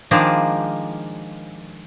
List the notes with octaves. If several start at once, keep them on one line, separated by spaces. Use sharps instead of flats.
D#3 F3 G#3 A#3 D4